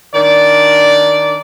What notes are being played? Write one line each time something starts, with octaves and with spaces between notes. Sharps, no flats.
D#3 D4 D5